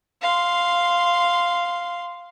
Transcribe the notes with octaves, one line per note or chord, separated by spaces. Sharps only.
F5 C6